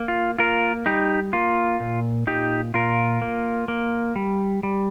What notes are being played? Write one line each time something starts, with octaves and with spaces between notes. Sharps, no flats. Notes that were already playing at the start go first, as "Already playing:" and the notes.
Already playing: A#3
F4
A#3 F4 A#4
G3 D#4 G4
A#3 F4
A#2
A#2 D#4 G4
A#2 F4 A#4
A#3
A#3
G3
G3